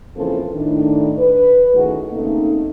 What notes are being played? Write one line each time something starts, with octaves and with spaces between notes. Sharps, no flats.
C#3 E3 F3 A#3 C4 A4
A2 D#3 D4
B4
F#2 A2 D#3 A3 F#4 G#4
C#3 A3 A#3 C4 D#4